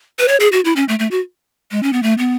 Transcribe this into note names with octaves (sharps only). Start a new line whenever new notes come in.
B4
C#5
G#4
F#4
E4
C#4
A3
A3
F#4
G#3
C#4
B3
A3
B3